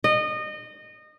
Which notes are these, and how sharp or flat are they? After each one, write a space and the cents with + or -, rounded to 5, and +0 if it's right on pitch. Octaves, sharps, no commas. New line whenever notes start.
D#5 -25